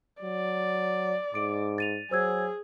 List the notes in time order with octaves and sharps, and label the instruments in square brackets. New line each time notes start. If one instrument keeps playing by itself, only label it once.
[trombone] F#3 [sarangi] D5
[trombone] G#2 [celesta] D6 D7
[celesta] A6 D#7 F7
[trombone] F#3 [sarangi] G#4 [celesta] C5 E6 G#6